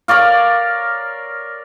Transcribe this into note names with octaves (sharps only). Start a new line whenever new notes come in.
A#4 C#5 D5 F5